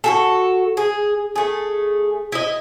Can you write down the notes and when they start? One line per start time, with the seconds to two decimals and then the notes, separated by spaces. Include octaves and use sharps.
0.04 F#4 G#4 A4
0.77 G#4
1.36 A3 G#4
2.32 E4 D#5